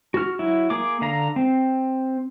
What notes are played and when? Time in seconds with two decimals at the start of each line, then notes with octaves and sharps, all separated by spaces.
0.14 F#4 F6
0.39 F#3 E4
0.70 A#3 G#4 D6
1.01 D3 F5 A#5
1.36 C4